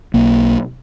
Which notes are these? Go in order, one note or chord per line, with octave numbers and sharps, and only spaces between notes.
B1 A#3